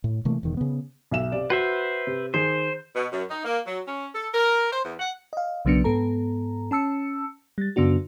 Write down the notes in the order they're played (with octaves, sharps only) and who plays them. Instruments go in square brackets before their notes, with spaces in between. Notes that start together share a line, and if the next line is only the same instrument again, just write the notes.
[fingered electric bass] A2
C3 E3 A3 A#3
E1 E2 D#3
C#3 B3
[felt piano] B1 E5 E7
C3 D5
[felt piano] F#4 [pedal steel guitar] B4 C5 E5
[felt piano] C3
[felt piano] D#3 G#4 G6 [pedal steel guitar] C5
[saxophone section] B2
F#2
D#4
A#3
F#3
C#4
A4
A#4
C5
E2
F#5
[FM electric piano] D#5 F5
B1 C#3 F#3 B3 D4 C#7
G#2 B3 A4 A#5
C#4 A5 E6 C#7
G3 A6
F#2 C#3 B3 D4 F#4